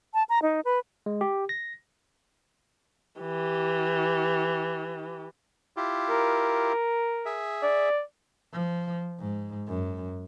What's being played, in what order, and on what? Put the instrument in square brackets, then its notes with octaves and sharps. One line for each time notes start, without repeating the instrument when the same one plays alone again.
[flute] A5
A#5
D#4
B4
[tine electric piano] G#3
G4
A#6
[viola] E3 G4
[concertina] E4 F4 G4
[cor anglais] A#4
[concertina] G#4 E5
[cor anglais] D5
[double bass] F3
G#2
F#2